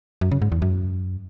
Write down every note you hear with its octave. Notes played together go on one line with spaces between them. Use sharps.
F#2
C#3
G#2
E2
F#2